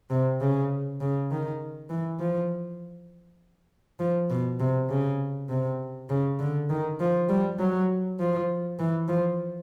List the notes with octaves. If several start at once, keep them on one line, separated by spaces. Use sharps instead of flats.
C3
C#3
C#3
D#3
E3
F3
F3
B2
C3
C#3
C3
C#3
D3
D#3
F3
G3
F#3
F3
E3
F3